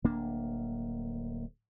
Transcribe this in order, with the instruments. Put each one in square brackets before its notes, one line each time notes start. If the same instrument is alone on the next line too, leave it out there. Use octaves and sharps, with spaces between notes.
[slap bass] D1 A#3 D4